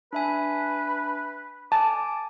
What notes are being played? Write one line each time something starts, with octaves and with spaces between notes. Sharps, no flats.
D4 B4 E5 G#5
G#5 A5 D6